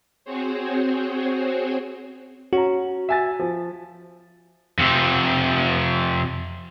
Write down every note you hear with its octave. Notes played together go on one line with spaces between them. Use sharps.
C4 F#4 G#4 C5 C#5
C#4 F#4 A#5
E5 G#5 A6
F3
F2 C3